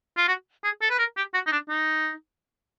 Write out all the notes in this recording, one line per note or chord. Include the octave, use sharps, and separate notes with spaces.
F4
F#4
G#4
A4
B4
A#4
G4
F#4
D#4
D4
D#4